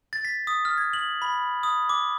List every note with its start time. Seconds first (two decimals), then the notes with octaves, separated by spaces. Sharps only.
0.13 A6
0.25 B6
0.47 D#6
0.65 F6
0.78 G#6
0.93 F#7
1.22 B5
1.63 D#6
1.89 D6